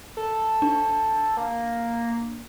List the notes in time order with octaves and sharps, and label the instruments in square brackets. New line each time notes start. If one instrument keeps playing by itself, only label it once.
[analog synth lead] A4
[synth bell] D4
[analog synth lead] A#3